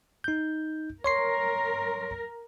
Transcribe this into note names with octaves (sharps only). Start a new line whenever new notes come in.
D#4 G6
A#4 C#5 C6 C7